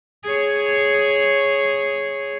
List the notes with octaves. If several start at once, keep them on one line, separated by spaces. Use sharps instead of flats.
G#4 C#5